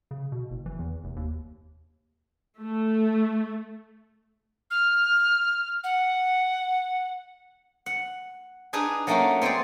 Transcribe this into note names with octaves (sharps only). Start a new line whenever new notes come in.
C#3
B2
F#1
E3
E2
F1
D#2
A3
F6
F#5
F#5
D4 D#4 G#4 B4
F#3 A3 A#3 C#4 D#4 F#4
B3 C4 G#4 C5 D5